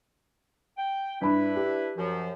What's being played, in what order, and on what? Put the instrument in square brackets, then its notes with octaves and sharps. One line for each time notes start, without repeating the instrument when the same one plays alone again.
[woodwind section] G5
[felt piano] G2 B5 [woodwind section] D4 E4 B4
[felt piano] G4
[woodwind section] F#2 F3